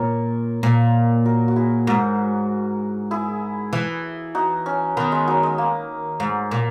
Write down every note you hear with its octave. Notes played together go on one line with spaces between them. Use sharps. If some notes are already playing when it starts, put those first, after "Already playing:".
Already playing: A#2 A#4 C#5
A#2
F#4 A#4
F#4
E4 G#4
G#2 F#4 A#4
E4 G#4
E3
D#4 F#4
C#4
D#3 B3
G#3
F#3
G#3
A#3
G#2
A#2